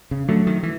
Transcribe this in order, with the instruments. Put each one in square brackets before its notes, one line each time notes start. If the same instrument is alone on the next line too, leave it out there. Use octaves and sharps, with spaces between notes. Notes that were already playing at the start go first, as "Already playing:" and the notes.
[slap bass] C#3
[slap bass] D3 [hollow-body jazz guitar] F#3 A3
[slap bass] D#3
E3